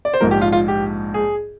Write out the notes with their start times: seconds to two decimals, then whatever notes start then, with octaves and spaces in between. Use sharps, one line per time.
0.05 D5
0.14 C5
0.20 A#1 G#2 F3 A#4
0.31 G4
0.41 F4
0.52 F4
0.68 G4
1.14 G#4